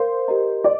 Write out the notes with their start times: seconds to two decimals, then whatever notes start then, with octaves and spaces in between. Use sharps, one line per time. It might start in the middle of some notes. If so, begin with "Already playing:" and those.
Already playing: A#4 C5 F5 C6
0.28 G4 A#4 D#5 A#5
0.64 D5 D#5